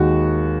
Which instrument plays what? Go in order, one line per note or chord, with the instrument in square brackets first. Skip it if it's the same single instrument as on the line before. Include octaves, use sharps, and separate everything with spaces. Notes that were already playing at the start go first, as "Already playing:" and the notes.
Already playing: [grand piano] D#2 D#3 G#3 F#4